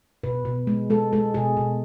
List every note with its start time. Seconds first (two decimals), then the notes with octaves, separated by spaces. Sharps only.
0.24 B2 B4
0.45 B2
0.67 G#3
0.90 G#3 A4
1.13 G#3 A4
1.34 B2 G#4
1.57 B2